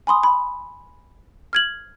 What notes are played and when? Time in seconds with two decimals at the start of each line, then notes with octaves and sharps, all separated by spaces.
0.07 G#5 B5 C6 D#6
0.23 B5
1.53 F6 G#6 F#7